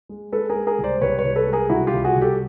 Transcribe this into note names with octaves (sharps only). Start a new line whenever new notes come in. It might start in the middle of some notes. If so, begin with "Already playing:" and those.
G#3
G#3 A4 B4
G#4 A#4
G#3
G#4 A#4
C2
C5 D5
C2 B4 C#5
B4 C#5
C2
A4 B4
G#3
G#4 A#4
C2 E4 F#4
F4 G4
C2
F#4 G#4
C2
G4 A4